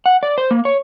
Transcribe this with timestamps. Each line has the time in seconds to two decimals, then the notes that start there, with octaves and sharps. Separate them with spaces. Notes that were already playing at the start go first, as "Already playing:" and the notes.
0.06 F#5
0.23 D5
0.38 C5
0.51 A#3
0.65 C#5